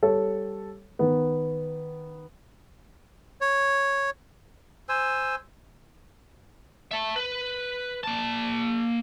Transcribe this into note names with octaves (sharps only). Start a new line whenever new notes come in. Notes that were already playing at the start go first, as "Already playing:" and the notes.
G3 A4 C#5
D#3 B3
C#5
C5 G#5 E6
E5 A5
B4
A#3 A5